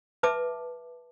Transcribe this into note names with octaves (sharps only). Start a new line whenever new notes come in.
B4 E5 A5 D6